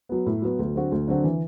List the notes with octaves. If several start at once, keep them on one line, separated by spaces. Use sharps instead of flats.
F#3 B3
A2
F#3 B3
D2
D3 F#3 C4 F#4
D2
D3 F#3 C4 F#4
E3